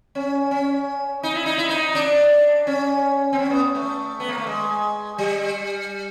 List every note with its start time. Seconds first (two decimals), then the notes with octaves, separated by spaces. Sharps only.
0.15 C#4
0.51 C#4
1.23 D#4
1.35 E4
1.46 D#4
1.58 E4
1.69 D#4
1.95 D4
2.67 C#4
3.33 C4
3.39 C#4
3.50 B3
3.75 A3
4.20 B3
4.29 A#3
4.38 A3
4.47 G#3
5.18 G3